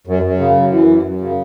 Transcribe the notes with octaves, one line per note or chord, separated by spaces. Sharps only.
F#2
F#2
C#3
F#2
E3
F#2
F#2
C#3